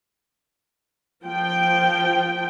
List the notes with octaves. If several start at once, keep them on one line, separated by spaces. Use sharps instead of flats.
F3 G5